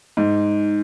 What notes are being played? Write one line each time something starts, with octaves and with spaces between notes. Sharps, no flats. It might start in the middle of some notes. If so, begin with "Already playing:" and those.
G#2